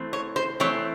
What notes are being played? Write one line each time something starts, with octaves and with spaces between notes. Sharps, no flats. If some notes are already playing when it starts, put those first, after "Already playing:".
Already playing: E3 A3 C4
C#5
C5
E3 A3 C4 C#5